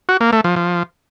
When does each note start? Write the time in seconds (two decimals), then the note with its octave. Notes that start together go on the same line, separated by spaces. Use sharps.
0.09 F#4
0.21 A#3
0.33 A3
0.44 F3
0.56 F3